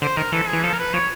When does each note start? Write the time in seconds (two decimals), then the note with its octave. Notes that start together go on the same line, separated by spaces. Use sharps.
0.02 D3 C5
0.17 D#3 A#4
0.32 E3 A4
0.47 G#4
0.53 E3
0.63 F3 A4
0.73 A#4
0.79 B4
0.94 F3 C#5